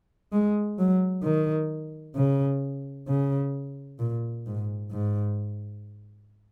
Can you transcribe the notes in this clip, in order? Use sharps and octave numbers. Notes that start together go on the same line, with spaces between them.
G#3
F#3
D#3
C#3
C#3
A#2
G#2
G#2